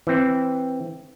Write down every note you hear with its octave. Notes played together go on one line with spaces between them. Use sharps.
E3 C4